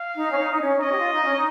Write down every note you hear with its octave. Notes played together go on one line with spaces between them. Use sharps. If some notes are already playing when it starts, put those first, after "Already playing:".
Already playing: F5
D#4
C#4
D#4
D#4
C#4
D#4
C#4 D#5
G4
F4
D#4
C#4
D#4